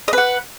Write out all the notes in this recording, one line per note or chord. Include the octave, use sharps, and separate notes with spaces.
B4 D#5 F#5